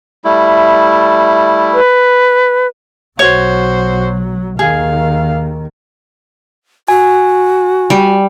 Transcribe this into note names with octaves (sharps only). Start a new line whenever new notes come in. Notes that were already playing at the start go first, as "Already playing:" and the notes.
G3 A3 E4
B4
B1 F#3 F#4 C5 C#5
D#2 D#3 G#4 F5
F#4 G#5
G3